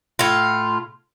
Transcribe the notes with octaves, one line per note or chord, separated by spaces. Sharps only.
A2 F4